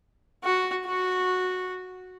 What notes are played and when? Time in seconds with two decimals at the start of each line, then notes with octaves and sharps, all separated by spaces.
0.44 F#4
0.85 F#4